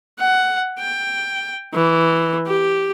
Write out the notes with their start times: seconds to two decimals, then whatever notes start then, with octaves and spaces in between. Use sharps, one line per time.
0.19 F#5
0.79 G5
1.74 E3
2.47 G4